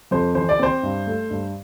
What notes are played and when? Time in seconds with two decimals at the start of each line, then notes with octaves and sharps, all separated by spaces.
0.11 F2 C5
0.35 E3 C5
0.49 D5
0.59 C4 C5
0.83 G2
1.07 A3
1.31 G2